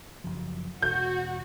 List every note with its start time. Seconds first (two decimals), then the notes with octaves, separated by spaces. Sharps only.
0.24 F#1 F3
0.82 E1 F#4 G6